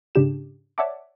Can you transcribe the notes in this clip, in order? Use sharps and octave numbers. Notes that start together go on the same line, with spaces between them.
G#2 C#3 D4 G4 E7
C#5 D5 E5 F#5 A5 D6